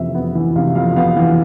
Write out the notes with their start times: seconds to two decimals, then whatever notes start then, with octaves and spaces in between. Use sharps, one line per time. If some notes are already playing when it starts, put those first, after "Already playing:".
Already playing: F2 C3 E3 C5 E5
0.15 B3
0.35 E3
0.56 C3 F5
0.75 F2 F5
0.96 B3 F5
1.17 E3